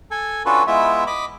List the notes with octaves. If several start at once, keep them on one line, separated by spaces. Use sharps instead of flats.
A4 G#5
C#4 D4 F4 F#4 A4 B4
G#3 B3 E4 F4 E5
D#5 B5 D6